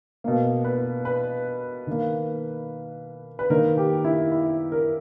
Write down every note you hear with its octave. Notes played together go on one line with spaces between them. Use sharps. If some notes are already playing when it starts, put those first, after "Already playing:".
B2 A#3
B4
B4
D#3 A#3
B4
D#3 A#3 A#4
G4
E4
E4
A#4